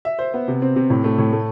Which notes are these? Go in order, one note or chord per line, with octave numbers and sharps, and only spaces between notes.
E5
C5
B3
C3
C4
C3
A2
A3
A2
A3